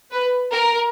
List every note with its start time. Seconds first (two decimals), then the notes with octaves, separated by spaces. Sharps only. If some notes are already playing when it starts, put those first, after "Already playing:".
0.12 B4
0.52 A#4